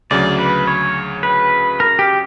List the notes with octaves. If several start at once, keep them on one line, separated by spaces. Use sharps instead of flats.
D2 C#3 F#3 D5
B4
C#5
B4
A#4
G4